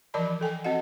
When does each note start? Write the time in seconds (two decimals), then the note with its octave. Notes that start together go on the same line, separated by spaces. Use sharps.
0.14 E3 F3 A#4 D5 A5 B5
0.41 A4 G5 G#5
0.64 C4 F#4 D#5 F#5